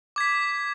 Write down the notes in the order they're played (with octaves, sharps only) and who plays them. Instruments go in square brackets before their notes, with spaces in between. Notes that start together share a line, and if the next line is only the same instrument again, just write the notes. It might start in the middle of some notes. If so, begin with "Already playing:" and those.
[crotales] D6 G#6 B6